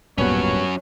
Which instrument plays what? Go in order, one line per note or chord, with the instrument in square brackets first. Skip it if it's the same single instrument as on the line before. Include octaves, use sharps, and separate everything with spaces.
[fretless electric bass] D1 A#2 [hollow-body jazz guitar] G2 B3 [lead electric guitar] F#3 C#4 [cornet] C#5